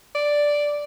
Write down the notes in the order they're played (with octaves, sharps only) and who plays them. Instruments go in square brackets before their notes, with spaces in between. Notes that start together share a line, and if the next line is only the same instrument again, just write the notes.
[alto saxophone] D5